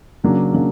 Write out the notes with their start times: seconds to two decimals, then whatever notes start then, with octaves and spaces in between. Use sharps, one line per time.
0.24 C#3 F#3 A#3 D4
0.53 C#3 F#3 A#3 D4